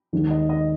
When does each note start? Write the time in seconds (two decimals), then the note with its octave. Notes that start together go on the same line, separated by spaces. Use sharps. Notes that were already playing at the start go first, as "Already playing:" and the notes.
0.13 D#2 D#3 G#3
0.31 D#5
0.49 D#5